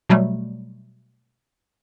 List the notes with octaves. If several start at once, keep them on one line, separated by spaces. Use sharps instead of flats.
B2 F#3 G3 A3